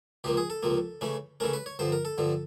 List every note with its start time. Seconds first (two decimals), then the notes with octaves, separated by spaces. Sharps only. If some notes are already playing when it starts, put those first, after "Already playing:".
0.24 C#2 C3 F3 A#3 G4
0.37 G#4
0.50 A4
0.63 C#2 C3 F3 A#3
1.01 C#3 E3 A3 C#4
1.40 C#3 E3 A3 C#4 A#4
1.53 B4
1.66 C#5
1.79 G2 D3 F3 C5
1.92 A#4
2.05 A4
2.18 G2 D3 F3